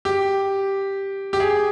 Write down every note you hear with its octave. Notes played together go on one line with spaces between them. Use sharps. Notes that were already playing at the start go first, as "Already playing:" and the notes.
G4
G4
G#4